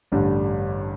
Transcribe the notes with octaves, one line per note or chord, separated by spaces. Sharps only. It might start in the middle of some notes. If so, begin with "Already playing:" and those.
A1 G2 D3 G3